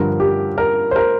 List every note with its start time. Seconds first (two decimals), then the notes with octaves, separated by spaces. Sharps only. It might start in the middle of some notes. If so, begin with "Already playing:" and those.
Already playing: G2 D3 F3 A#4
0.20 G4
0.58 A#4
0.91 C5
0.96 A#4